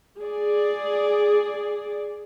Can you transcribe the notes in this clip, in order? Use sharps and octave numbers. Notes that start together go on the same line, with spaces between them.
G#4 D5